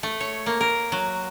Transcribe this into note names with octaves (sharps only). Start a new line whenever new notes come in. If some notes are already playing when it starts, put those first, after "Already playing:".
A3
C#5
A#3
A#4
F#3